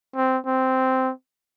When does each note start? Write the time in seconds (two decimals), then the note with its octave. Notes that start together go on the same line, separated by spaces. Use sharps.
0.16 C4
0.46 C4